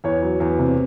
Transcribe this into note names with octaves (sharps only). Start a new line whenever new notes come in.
E2 C#5
F#3
E2
C3